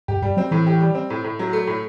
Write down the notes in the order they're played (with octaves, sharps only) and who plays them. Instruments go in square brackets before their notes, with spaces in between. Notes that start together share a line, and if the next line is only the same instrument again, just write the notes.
[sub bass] G2 [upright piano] G4
[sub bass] G2 [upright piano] G3
[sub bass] F#3 [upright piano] C4
[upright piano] A2 [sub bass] E3
[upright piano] G4
G3
C4
A2
A2
F#3
A3
A2